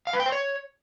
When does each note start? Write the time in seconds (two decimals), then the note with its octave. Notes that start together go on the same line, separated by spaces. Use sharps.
0.07 F5
0.13 B4
0.20 G5
0.26 C5
0.32 C#5